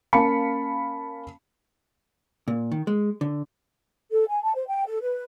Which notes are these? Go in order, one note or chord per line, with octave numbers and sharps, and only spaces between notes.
A#3 C#4 F5 A5 B5 C#7
A#2
D#3
G#3
D3
A4
G#5
A5
C5
G5
A4
B4